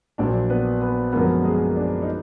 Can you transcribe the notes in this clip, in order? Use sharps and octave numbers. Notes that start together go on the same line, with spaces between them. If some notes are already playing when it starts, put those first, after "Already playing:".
A#1 A#2 F#3 D4 D5
B3 B4
B3 B4
F#2 D3 F3 G#3 A#3 B3 A#4
G#3 G#4
D4
D#4